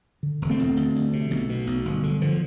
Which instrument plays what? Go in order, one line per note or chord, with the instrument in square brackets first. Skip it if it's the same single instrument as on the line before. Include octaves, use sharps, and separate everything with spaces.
[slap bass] D3
E1
A3 C4
E2
D2
D2
C3
B1
B2
B1
G1
D3
D3 F3